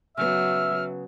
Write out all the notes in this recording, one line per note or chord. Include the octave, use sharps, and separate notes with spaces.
C#3 F#3 B3 E5 F6